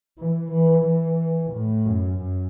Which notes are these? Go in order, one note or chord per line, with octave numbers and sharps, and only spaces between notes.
E3
E3
E3
A2
F#2
F#2